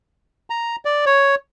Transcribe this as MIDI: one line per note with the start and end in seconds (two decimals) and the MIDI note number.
0.50 0.76 82
0.85 1.05 74
1.06 1.35 73